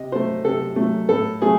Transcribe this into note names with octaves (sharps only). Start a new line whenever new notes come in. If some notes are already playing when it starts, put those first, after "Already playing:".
Already playing: C3 D#5
F#3 A3 C5
C3 A4
F#3 A3
A2 A4
F#3 A3 G#4